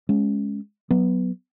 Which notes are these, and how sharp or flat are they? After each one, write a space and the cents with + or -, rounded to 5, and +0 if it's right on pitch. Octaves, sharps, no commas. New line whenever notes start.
G#3 +5 C#4 +0
F#3 +0 B3 +0